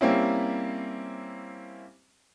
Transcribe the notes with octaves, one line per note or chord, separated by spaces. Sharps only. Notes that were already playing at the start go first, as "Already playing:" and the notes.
G3 A#3 C4 C#4 E4